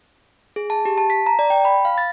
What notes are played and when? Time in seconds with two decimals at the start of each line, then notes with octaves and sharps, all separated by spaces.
0.56 G#4
0.70 A5
0.85 G4
0.98 A5
1.10 B6
1.26 A#5
1.39 D5
1.50 G5
1.65 B5
1.85 F5
1.98 A6